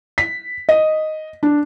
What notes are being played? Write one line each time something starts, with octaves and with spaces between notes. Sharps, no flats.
B6
D#5
D4